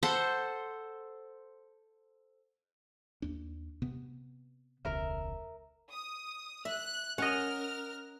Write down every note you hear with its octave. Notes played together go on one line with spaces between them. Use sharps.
A4 C5 F#5
D#2 D4
C3 B3
E1 C#2 A#4 E5
D#6
E5 F#6
C#4 A#4 D#5 F#5 F6